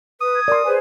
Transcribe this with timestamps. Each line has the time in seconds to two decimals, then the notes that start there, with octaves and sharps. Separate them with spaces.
0.21 B4 D#6
0.35 G#6
0.48 A#4 D5 C6
0.65 G#4 B4 C5 G#5